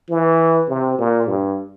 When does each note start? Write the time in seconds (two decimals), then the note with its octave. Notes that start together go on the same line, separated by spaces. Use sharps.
0.10 E3
0.69 C3
0.98 A#2
1.27 G2